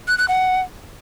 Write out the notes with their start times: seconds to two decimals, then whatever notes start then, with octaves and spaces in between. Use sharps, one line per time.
0.08 F#6
0.18 F#6
0.28 F#5